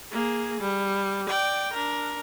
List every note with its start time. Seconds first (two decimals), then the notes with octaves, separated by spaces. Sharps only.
0.12 A#3 G#4
0.61 G3
1.29 D5 G5
1.73 D4 A#4